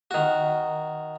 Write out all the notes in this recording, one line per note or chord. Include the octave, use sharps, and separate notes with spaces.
D#3 F#4